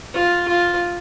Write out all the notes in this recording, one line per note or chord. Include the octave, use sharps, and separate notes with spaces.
F4
F4